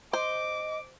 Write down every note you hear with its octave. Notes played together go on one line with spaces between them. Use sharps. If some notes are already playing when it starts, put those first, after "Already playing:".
C5 D#5 D6